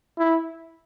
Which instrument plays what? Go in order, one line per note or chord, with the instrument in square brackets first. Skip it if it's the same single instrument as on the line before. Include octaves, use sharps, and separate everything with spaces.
[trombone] E4